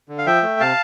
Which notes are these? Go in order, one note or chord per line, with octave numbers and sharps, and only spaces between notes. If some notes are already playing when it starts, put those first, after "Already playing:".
D3
F5
F3 E5 G5
A3
C3 F5 A5